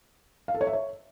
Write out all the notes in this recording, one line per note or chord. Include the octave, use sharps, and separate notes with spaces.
F5
A4
C#5
E5
C#5